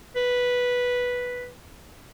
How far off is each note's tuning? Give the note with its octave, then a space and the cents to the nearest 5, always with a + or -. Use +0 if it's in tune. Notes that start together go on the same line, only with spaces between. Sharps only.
B4 -5